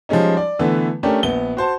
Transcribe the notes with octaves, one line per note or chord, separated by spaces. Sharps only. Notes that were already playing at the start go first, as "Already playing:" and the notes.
F3 G3 G#3 C#4 D#4
D5
D3 E3 A3 B3
A3 C#4 D4 G4 A#4
A#1 B3 G7
F#4 C5 A5